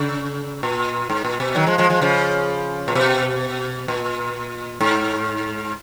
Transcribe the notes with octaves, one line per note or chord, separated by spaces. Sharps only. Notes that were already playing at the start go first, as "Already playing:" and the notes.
Already playing: C#3
A#2
G#2
A#2
B2
D#3 F#3
F3 G#3
F3 G#3
F3 G#3
C#3 F3
A#2
B2
A#2
G#2